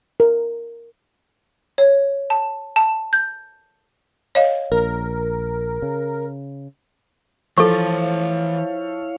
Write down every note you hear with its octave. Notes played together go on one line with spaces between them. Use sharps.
A#4
C#5
A5
A5
G6
C#5 D#5 F5
A#1 A#4
C#3
E3 F3 E4 A4 C#5 F5 A5 C#6